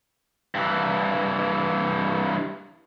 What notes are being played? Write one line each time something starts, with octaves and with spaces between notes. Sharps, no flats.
G2 E3